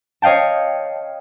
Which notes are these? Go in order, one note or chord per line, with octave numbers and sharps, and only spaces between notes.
C#5 D#5 F5 G5 A5